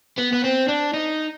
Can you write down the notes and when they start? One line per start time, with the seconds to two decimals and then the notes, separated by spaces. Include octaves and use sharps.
0.19 B3
0.33 B3
0.45 C4
0.69 D4
0.94 D#4